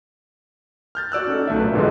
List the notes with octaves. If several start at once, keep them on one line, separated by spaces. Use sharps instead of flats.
F6 G6 A6
F#4 D5 E6 F#6
C#4 D#4 F#4 A4
B1 A3 D4 E5
A#2 B4
C#2 G#2 D3 F3 G#3